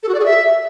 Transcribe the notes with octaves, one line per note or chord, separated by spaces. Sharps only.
A4
F#4
D5
G#4
E5